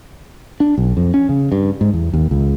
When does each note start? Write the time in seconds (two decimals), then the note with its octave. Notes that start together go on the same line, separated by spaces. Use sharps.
0.60 D4
0.78 B1
0.97 F2
1.14 C#4
1.29 C#3
1.52 G2
1.81 G#2
1.93 E2
2.13 D#2
2.31 C#2